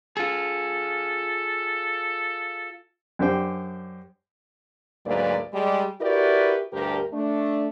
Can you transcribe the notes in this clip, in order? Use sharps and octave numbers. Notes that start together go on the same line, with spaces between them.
F4 G#4 A4
F#2 D4 G4 C5 G5
D2 G#2 F#3 A#3 B4 D5
G3 G#3 G4
E4 F#4 G4 A#4 B4 D5
D2 G2 G4 A#4
A3 D4